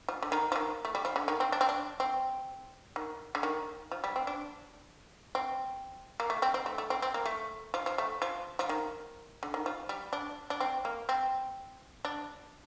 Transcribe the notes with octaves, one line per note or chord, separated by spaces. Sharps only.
F3
D3
D#3
F3
D#3
A3
G3
F3
D3
D#3
C4
D4
C4
D4
C4
D#3
D3
D#3
F3
G3
C4
D4
C4
A#3
A3
C4
C4
A3
A3
C4
C4
A#3
A3
F3
F3
A3
F3
F3
D#3
D3
D#3
F3
G3
D4
D4
C4
A#3
C4
D4